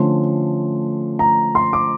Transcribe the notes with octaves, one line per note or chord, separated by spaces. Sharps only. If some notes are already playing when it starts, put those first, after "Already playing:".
Already playing: D3 F3 A3 C#4 C6
A#5
C6
D6